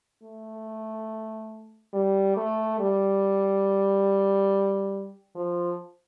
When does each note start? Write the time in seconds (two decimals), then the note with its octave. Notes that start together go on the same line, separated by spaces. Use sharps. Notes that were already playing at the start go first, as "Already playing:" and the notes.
0.23 A3
1.93 G3
2.36 A3
2.80 G3
5.35 F3